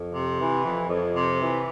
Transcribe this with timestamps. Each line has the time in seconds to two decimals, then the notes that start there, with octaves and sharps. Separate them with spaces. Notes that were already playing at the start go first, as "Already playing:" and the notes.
Already playing: F2
0.13 C3
0.39 E3
0.64 F2
0.89 F2
1.15 C3
1.41 E3